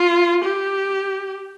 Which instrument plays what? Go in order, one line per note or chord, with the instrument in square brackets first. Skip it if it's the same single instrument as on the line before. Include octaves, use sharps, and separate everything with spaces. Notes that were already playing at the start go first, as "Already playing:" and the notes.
Already playing: [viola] F4
G4